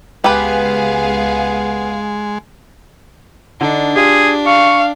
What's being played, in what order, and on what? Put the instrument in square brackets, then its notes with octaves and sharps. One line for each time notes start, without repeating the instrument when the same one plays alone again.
[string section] C#2 G#4 F5 [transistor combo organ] G#3 [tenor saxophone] B3 [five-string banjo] G4 B4
[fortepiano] D3 D#4 [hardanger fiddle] D4
[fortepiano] F4 G4 [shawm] G#4
[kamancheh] F5 [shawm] C#6